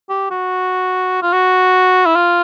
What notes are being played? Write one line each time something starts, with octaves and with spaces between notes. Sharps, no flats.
G4
F#4
F4
F#4
E4
F4